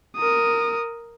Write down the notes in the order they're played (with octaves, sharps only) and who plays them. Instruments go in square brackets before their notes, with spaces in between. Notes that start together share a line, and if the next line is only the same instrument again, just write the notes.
[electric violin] A#4 D#6